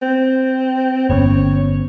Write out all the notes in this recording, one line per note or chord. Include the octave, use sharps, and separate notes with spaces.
C4
G1 B3 C#4 C#5